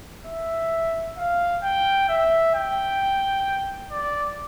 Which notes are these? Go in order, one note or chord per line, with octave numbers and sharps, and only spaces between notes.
E5
F5
G5
E5
G5
D5